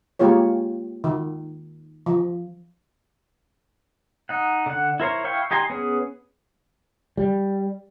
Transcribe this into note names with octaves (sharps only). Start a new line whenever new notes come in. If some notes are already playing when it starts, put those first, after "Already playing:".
G#3 A#3 F4 G4 C#5
D#3
F3
D#4 F#5
D3 F#5
E4 A#4 C5 C#5
E4 F5 G5 C#6
D#4 G4 G#5 A#5 C6
B3 C#4 G#4
G3